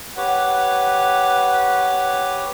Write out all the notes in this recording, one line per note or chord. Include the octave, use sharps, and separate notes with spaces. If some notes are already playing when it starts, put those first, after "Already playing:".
G4 B4 C#5 F#5